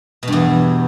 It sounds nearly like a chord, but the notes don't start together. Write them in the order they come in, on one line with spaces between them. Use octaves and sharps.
B2 G2 E2